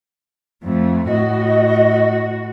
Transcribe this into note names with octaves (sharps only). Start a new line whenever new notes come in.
F2 A3
A2 F#4 D#5